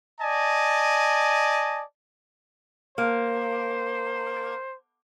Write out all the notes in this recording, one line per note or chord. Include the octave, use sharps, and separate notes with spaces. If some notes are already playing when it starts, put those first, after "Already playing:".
D5 D#5 G#5 A5
A#3 C5